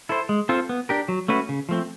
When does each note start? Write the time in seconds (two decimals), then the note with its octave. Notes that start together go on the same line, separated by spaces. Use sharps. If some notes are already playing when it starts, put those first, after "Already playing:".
0.09 E4 A4 C5
0.29 G#3
0.49 C4 F4 A4 C5
0.69 B3
0.89 D4 G4 A#4
1.08 F#3
1.28 A3 C#4 F#4 B4
1.49 C#3
1.69 F3 A3 C4